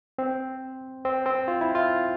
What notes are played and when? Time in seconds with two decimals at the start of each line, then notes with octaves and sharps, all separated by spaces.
0.18 C4
1.05 C4
1.26 C4
1.48 F4
1.61 E4
1.75 F4